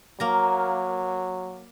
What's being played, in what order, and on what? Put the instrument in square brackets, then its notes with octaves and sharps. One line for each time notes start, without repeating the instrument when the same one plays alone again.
[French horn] F#3 [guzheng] A#3 A#5